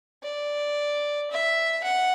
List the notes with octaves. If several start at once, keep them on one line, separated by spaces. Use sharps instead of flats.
D5
E5
F#5